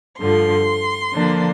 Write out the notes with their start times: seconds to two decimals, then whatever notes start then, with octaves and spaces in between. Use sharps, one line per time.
0.20 G2 D3 F3 C6
1.12 D3 F3 A#3 D4